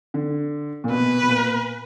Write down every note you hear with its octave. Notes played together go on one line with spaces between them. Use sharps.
D3
A#2
B2 B4
B2
A#2